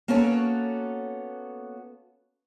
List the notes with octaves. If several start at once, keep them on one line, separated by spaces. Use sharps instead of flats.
A#3 B3 C#4 F#4 A4 C#5